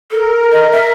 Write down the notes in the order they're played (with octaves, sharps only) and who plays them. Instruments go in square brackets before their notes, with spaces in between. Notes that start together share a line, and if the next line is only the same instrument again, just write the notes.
[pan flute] A4 [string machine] A#4
[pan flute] D#5
E5